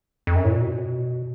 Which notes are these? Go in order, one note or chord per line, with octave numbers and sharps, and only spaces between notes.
F2
F#2
A2
A#2
B2